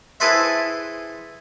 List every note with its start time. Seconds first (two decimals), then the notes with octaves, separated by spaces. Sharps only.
0.20 E4 G#4 A4 B4 C5 E5